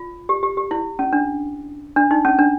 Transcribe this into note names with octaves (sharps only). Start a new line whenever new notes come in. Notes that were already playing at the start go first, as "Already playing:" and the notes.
Already playing: F4
G4
G4
G4
E4
C#4
D4
D4
D#4
C#4
D4